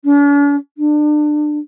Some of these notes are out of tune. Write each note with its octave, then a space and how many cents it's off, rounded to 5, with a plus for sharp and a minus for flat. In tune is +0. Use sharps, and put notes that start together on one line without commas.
D4 -45
D4 +30